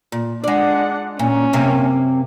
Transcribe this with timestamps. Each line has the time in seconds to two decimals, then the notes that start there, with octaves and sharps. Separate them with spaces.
0.12 A#2
0.44 G#3 D4 D5 F#5
1.19 A#2 C#4
1.53 F#2 C3 A#3